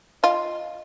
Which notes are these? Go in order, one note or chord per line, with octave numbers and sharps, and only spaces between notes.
F4 D#5